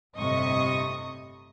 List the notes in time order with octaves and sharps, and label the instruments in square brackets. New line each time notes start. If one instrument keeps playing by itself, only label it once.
[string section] G1 A2 C3 D#5 C#6 D#6